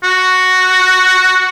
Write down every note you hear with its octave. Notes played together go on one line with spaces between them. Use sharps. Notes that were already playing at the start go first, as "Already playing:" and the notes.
F#4